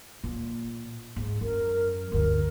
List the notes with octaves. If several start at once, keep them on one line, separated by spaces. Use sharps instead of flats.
A#2
G#2
F#2 A#4
D2 G2 A#4